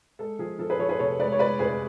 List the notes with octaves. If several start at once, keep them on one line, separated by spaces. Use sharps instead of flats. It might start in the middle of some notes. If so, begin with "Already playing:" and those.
G#3 A4
F3 G#4
F3 A4
G#4 B4
F3 A4 C#5
G#4 B4
F1 A4 C#5
G#3 B4 D5
C#5
G#3 B4 D5
F1 G#4 B4